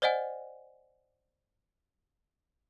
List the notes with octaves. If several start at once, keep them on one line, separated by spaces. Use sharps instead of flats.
C5 D5 D#5 F#5 G#5